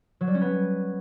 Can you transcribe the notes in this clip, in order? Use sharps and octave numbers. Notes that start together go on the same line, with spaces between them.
F#3
G3
C#4
B3